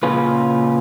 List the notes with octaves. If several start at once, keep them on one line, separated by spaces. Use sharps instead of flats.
A#2 C#3 C#4 F4 B4